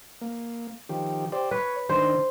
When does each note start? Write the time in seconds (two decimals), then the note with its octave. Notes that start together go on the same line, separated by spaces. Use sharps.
0.21 A#3
0.89 D#3 F3 G4
1.32 G4 C5 D5
1.51 B4 C#5
1.89 D#3 D4 C5